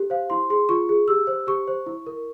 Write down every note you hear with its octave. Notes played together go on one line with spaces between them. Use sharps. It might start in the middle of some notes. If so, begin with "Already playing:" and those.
Already playing: G4
C5 F5
E4 C6
G#4 C6
F4 C#6
G#4
G4 E6
C5
G4 C#6
C5
E4
A#4